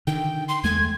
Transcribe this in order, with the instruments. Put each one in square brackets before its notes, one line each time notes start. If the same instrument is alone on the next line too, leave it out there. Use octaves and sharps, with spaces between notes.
[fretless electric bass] D3 D#3 [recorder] G5
[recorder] C6
[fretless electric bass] E2 G#3 A3 [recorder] G#6